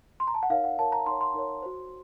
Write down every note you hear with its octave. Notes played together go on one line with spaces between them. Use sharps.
C6
A#5
A5
F#5
D#4 A#4 C#5 F5
F#5
D#4 A#4 C#5 A5
A#5
D#4 A#4 C#5 C6
C6
D#4 A#4 C#5
F#4 C5